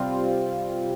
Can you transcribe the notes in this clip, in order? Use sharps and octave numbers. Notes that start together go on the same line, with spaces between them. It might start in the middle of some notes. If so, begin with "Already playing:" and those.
Already playing: C3 G3 C4 F4